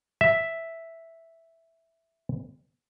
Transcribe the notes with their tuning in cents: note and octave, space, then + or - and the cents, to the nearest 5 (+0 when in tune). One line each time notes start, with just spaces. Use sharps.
E5 +0